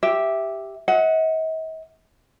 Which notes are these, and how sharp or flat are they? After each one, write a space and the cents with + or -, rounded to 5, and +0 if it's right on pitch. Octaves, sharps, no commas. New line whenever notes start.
G4 +0 E5 +0
D#5 +45 F#5 +0